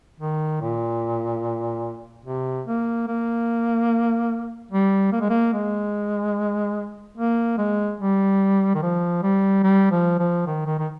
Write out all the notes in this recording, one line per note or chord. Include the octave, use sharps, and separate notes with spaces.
D#3
A#2
C3
A#3
A#3
G3
A#3
G#3
A#3
G#3
A#3
G#3
G3
D#3
F3
G3
G3
F3
F3
D#3
D#3
D#3